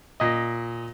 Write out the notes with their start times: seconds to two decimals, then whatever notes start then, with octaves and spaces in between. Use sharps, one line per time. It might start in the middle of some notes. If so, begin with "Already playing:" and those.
0.20 A#2 D#5